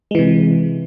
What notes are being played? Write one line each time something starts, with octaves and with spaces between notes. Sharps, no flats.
C3 E3 G#3